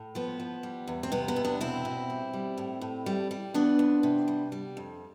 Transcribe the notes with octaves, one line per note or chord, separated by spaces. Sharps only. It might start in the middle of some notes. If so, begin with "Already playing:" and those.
Already playing: A2
F3 B3
F3
G3
E2
C4
C3 B3
B3
E2
B3 D4
B2 C4 E4
B2
G3
G3
A2
A2
G3
G3
E3 B3 D4
F2
C3
G3
G3
F2